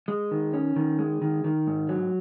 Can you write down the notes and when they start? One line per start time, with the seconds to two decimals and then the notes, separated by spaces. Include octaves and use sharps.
0.08 G#3
0.31 D#3
0.53 C#4
0.76 D#3
0.99 G#3
1.22 D#3
1.44 D#3
1.67 G#2
1.89 F#3